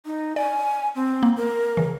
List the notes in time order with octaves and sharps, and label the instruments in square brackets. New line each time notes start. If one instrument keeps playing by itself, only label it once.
[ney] D#4
[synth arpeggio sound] D5 [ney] G#5
[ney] C4
[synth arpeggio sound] A#3
[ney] A#4
[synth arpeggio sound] C#3 E3